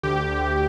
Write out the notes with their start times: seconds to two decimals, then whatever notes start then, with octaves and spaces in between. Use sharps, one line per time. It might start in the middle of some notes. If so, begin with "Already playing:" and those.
0.03 D2 G4
0.31 D2